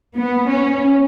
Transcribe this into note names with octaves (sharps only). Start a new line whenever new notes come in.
B3
C#4